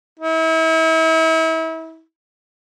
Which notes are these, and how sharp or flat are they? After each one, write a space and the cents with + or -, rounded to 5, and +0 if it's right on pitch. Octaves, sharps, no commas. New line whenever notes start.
E4 -35